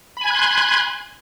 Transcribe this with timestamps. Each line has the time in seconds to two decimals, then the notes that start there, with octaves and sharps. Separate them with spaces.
0.17 B5
0.21 G#5
0.26 G#6
0.30 F#6
0.35 C6